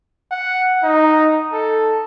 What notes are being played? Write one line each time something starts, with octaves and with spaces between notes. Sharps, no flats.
F#5
D#4
A4